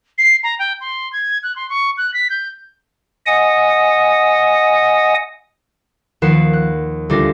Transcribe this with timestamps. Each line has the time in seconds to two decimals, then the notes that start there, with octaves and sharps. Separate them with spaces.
0.18 C7
0.43 A#5
0.59 G5
0.81 C6
1.13 G#6
1.43 F#6
1.56 C6
1.69 C#6
1.98 F#6
2.14 B6
2.30 G6
3.27 D#5 F#5 G#5 D#6
6.22 D#2 F3 B4 F#5 C7 E7
6.53 F#6
7.10 D2 G3 D4 F4 A#6